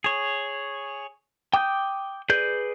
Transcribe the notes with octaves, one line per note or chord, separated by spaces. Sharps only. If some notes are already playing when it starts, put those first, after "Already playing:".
G#4 C#5
G5 D6 D#6 G6
G#4 B4 D5 G6